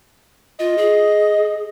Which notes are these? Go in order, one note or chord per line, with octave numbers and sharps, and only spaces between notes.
F4 D#5
G#4